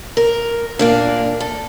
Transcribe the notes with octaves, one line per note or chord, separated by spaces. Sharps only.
A#4
A#2 A#3 D4
A4